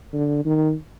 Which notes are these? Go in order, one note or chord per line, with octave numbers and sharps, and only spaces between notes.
D3
D#3